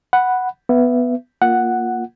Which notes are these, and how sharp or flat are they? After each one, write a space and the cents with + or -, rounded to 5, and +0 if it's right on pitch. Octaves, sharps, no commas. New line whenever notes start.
F#5 +0 B5 +0
B3 +0 E5 +25
A#3 +0 F4 +0 F#5 +0